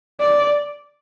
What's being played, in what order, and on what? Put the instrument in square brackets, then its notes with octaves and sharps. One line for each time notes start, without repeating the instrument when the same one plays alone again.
[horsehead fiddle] D5